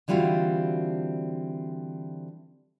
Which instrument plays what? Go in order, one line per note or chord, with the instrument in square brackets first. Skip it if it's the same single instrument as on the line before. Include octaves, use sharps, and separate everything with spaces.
[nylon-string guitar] D3 E3 G3 C4 F4 F#4